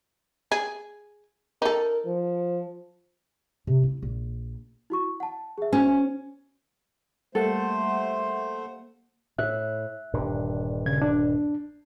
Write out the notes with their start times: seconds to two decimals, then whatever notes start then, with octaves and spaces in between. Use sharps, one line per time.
0.52 G#4
1.62 D#4 A4 A#4
2.06 F3
3.67 C3
3.83 E4
4.02 A#1
4.90 E4 F#4 C#6
5.20 F#5 A5
5.58 G#4 E5
5.73 C#4 F#4 C5 G#5
7.35 G3 A3 A#3 A4 C5 F#5
9.38 A2 E5 F#6
10.13 D#1 G2 D3
10.86 C#3 G#6
11.02 D4